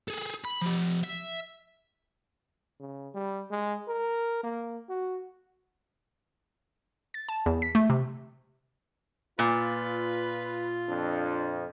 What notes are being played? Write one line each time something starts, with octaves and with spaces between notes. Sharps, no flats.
G#4 A4
B5
F3 G4
E5
C#3
G3
G#3
A#4
A#3
F#4
A6
A5
E2
B6
A3
C3
A#2 F4 B4
F2 D4